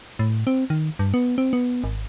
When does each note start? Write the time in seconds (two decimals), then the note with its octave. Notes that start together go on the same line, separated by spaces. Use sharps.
0.19 A2
0.47 C4
0.70 D#3
0.99 G2
1.14 B3
1.38 C4
1.53 B3
1.84 G#1